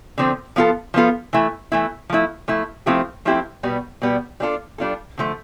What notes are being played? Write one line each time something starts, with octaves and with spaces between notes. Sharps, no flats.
D3 F3 C4
F3 B3 F4 A4
F3 B3 F4 A4
E3 A3 E4
E3 A3 E4
F3 A3 E4
F3 A3 E4
F3 A3 C4 E4 G4
F3 A3 C4 E4 G4
B2 G3 B3
B2 G3 B3
G3 D4 F4 A4
G3 D4 F4 A4
D3 F3 A3